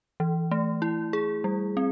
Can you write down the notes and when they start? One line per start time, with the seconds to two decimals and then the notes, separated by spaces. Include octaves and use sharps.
0.20 E3
0.51 A3
0.82 E4
1.13 G#4
1.44 G3
1.77 C4